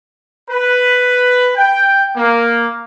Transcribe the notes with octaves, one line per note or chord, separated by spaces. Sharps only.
B4
G5
A#3